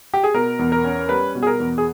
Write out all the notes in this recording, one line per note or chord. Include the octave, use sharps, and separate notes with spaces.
G4
G#4
B2 A#4
E2
A#4
C#4
G3 B4
B2
G#4
A#4
E2
G#4